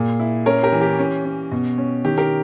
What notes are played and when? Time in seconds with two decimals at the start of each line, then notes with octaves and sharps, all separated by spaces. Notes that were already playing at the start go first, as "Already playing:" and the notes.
Already playing: A#2 A#3 G#4
0.20 E4
0.46 C#4 A#4 C#5
0.63 G4 A#4
0.72 E3
0.81 G4
0.99 C#4
1.25 C#4
1.52 B2
1.78 C#4
2.05 D#3 G4
2.18 G4 A#4